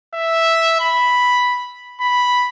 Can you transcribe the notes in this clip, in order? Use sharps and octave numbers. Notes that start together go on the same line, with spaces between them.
E5
B5
B5